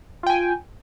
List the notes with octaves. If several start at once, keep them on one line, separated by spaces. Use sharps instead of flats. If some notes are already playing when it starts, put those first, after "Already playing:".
F4 G5 G#5